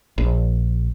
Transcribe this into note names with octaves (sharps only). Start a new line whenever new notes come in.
A#1